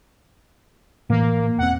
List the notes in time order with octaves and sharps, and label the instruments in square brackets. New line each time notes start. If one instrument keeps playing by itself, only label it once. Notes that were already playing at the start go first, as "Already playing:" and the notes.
[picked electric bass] A2 E3 [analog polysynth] A#3
[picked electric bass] E1 C4 [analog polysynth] F#5